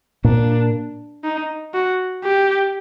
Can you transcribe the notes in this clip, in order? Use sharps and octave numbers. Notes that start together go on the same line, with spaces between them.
A#2 A#3 D4
D#4
F#4
G4